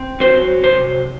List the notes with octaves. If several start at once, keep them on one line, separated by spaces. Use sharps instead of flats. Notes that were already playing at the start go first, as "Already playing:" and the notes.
Already playing: C4
F#3 C5
C3 C5